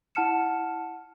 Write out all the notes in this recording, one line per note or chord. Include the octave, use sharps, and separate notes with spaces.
E4 F#5 A5 F6 C#7 E7